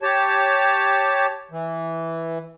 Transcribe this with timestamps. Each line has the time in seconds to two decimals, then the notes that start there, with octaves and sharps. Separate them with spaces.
0.02 G4 C#5 A5
1.51 E3